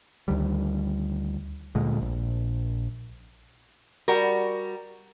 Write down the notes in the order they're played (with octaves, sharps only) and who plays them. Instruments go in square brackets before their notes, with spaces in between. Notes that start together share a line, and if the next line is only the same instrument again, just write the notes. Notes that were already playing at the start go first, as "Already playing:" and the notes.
[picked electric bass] D2 D#3 G3
D2 A#2 G#3
A#1
[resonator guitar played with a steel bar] G3 F#4 A#4